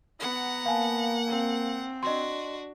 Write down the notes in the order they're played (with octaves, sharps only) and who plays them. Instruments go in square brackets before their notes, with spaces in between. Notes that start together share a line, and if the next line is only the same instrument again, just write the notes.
[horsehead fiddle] B3 A#5 [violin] F#5
[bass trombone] A#3 [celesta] F5 G#5 A5
[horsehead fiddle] C4
[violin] D4 F#4 [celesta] D#5 C6